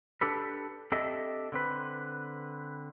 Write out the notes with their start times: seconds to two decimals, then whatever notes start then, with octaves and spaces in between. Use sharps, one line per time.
0.21 D4 G4 A4 B4
0.92 C4 D4 G4 A4 D#5 E5
1.52 D3 C4 B4